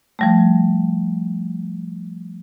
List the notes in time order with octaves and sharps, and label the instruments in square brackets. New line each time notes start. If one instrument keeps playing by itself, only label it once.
[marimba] F3 G3 A3